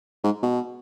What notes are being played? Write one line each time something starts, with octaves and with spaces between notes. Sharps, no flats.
G#2
B2